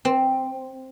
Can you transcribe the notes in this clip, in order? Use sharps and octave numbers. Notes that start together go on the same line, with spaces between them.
C4